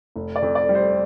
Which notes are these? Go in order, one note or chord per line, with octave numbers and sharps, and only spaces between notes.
F1
D5
F2
D5
G3
C5